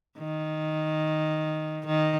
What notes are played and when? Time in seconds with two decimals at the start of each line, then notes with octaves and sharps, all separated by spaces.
0.18 D#3
1.86 D#3